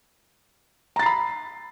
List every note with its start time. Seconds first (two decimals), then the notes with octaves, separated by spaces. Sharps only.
0.96 A#5
0.99 A6
1.03 C7
1.06 B5